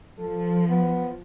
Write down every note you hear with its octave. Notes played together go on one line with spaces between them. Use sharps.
F3 A4
B3